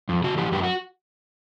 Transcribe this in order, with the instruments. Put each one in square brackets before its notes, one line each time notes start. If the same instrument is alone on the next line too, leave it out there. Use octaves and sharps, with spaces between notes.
[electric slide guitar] F2
C#3 F#4
E3 G4
F#2 G4
F#4